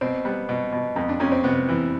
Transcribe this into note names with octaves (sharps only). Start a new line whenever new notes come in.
B2 C4
G3 B3
B2
B2
F2
D4
F2 C#4
C4
C3 B3
E3